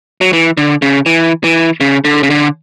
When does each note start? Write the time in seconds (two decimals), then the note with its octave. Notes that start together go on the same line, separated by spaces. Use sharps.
0.21 F#3
0.33 E3
0.57 D3
0.82 C#3
1.06 E3
1.44 E3
1.81 C#3
2.05 D3
2.23 C#3
2.30 D3